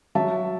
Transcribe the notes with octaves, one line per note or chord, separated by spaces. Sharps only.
F#3 E5 A5